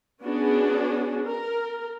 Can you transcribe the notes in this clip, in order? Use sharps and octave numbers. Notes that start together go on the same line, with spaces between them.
B3 C#4 D4 F#4 G#4
A#4